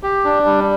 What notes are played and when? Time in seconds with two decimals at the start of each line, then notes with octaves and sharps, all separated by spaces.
0.03 G4
0.25 D4
0.46 G3